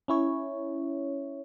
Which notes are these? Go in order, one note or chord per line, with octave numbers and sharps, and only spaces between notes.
C#4 E4 C#5